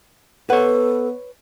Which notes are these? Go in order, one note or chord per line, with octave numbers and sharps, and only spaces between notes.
B3 A4 B4 C#5 F#5